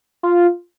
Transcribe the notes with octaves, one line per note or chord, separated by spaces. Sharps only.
F4